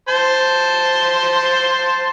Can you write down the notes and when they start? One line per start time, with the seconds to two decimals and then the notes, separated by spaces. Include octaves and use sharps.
0.09 C5 A5 C6